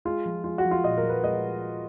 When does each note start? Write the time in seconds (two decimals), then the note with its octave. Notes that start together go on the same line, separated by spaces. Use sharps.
0.05 G#3 F4
0.26 F3
0.44 G#3 F4
0.58 F#4
0.65 F3
0.71 F4
0.84 A#2 D#5
0.98 A#4
1.03 F3
1.09 B4
1.24 G#3 D#5